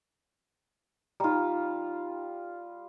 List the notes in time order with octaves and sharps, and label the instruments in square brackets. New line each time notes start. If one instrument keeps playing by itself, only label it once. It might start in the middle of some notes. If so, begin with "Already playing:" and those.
[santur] G3 F4 [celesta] D#4 A#5